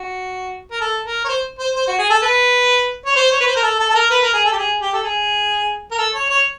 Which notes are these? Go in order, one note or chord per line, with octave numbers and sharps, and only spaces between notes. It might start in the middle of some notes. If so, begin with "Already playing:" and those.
Already playing: F#4
A#4
A4
A#4
C#5
C5
C5
C5
F#4
G#4
A4
B4
C#5
C5
C#5
B4
C5
A#4
A4
A4
A4
A#4
B4
A#4
G#4
A4
G4
G#4
G4
A4
G#4
A#4
A4
C#5
C#5